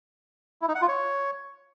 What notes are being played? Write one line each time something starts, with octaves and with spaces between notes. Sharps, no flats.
E4
D#4
F#5
F4
C#5